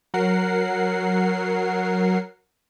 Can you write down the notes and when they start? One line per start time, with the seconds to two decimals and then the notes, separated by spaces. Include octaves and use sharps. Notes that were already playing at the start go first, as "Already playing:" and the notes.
0.14 F#3 A#4 F#5 C7